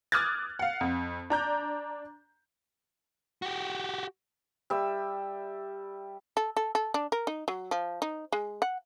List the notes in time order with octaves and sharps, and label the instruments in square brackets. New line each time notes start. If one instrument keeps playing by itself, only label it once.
[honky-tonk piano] D6 D#6 F6 F#6 G#6 A6
F5 F#5
F2
D4 A#5 G6
[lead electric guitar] F#4 G4
[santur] G3 E5 E6
[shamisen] A4
A4
A4
D4
A#4
D#4
F#3
F3
D#4
G#3
F#5